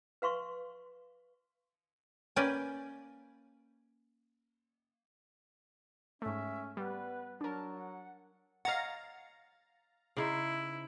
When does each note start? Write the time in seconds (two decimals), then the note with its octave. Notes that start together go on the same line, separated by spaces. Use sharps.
0.22 B4 F5 C6 C#6
2.36 A#3 C#4 B4 D5 G5 G#5
6.22 G#2 A3 C#4 E5
6.77 G3 B3 B4
7.41 F#3 D4 A#4 A5
7.75 F#5
8.65 C#5 D#5 F5 F#5 A#5 A6
10.17 C#3 D#4 E4 C5